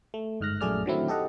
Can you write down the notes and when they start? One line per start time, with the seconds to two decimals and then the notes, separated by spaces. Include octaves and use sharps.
0.14 A3
0.41 G1 G#2 F6 F#6 A#6
0.61 A#1 F#2 A3 G#4 D5 F6
0.86 D3 D#3 F#3 A3 C4 E4
1.08 G4 A4 D#5 F#5